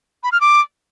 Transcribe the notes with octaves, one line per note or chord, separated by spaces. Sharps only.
B5
F6
D6